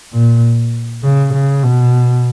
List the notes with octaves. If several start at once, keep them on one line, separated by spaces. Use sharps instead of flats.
A#2
C#3
C#3
B2